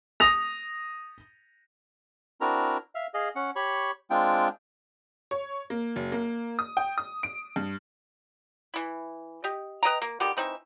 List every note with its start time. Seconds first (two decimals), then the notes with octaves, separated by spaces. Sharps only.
0.20 D#6 A#6 F7
2.41 C4 D4 E4 F#4 A#4 A#5
2.95 E5 F5 F6
3.14 G#4 D#5 F5
3.36 C#4 F#5
3.56 G4 C#5 B5 C#6
4.10 G#3 C4 D4 F4 G5
5.31 C#5
5.70 A#3
5.96 F#1
6.12 A#3
6.59 D#6
6.77 G5
6.98 D#6
7.23 D7
7.56 G2
8.74 E3 E4
9.44 G4 D#5
9.83 B4 D#5 G5 A#5
10.02 A#3
10.20 D3 D#3 G3 G4
10.37 E3 C4 D#4 E5